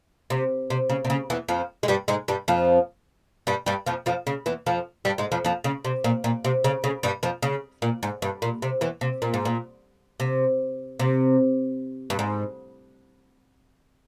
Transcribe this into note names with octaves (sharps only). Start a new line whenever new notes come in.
C3
C3
C#3
C3
C#3
E2 E3
F2 F3
G#3
G2 G3
G#2 G#3
G2 G3
F2 F3
G2 G3
G2 G3
F2 F3
F2 F3
C#3
E2 E3
F2 F3
G2 G3
G#2 G#3
F2 F3
F2 F3
C#3
C3
A#2
A#2
C3
C#3
C#3
G2 G3
F2 F3
C#3
A#2
G#2
G2
A#2
C3
E2 E3
C3
A#2
G#2
A#2
C3
C3
G2
G#2